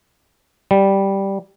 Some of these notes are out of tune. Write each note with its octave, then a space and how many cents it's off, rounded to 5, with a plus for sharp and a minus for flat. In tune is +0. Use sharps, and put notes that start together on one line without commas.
G3 -5